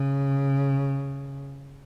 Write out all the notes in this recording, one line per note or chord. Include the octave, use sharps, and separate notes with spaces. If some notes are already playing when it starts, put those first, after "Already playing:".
Already playing: C#3